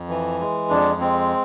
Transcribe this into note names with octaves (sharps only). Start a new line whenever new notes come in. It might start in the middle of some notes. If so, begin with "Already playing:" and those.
Already playing: F2
E3
G#3
F2 D4
G#3 C4